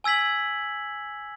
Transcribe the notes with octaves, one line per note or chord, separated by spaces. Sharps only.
G#5 E6 G#6 B6 F#7